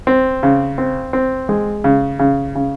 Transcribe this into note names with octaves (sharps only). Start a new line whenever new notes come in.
C4
C#3
C4
C4
G#3
C#3
C#3
C#3